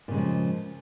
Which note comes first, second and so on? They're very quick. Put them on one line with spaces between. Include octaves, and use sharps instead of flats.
A#2 C#3 G#3 F3